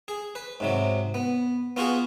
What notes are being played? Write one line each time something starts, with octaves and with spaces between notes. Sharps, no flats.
G#4
B4
G#2 C3 F#3
B3
B3 F4 F#4 G#4 F#5